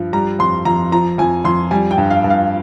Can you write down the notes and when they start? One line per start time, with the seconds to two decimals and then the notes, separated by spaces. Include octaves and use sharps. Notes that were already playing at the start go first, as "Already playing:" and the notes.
Already playing: G2 F3
0.13 G3 A#5
0.39 F2 C6
0.65 F2 A#5
0.92 F3 A#5
1.18 F2 G#5
1.45 F2 C6
1.71 G3 G#5
1.91 G5
1.98 G2
2.10 F5
2.24 G2
2.30 F5